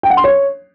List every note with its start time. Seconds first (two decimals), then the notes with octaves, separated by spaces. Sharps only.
0.03 G5
0.10 F#5
0.17 C6
0.24 C#5